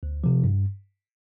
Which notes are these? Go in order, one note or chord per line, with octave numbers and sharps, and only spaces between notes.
D2
C3 F3
G2